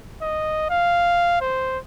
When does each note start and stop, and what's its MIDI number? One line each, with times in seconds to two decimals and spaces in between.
0.22 0.66 75
0.70 1.38 77
1.41 1.78 72